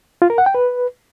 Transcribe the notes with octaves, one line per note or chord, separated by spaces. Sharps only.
F4
A#4
F#5
G5
B4